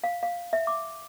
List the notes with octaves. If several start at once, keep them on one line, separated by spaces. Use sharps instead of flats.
F5
F5
E5
D6